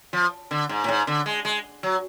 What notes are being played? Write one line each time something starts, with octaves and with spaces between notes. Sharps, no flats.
F3
D3
G#2
A2
G#2
D3
G#3
G#3
F#3